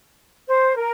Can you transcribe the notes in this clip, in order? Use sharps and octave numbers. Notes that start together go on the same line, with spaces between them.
C5
A#4